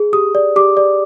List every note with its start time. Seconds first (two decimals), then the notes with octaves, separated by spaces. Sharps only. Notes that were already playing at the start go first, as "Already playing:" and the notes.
Already playing: G#4
0.13 G4 D#6
0.35 D5
0.56 G4 D6
0.77 D5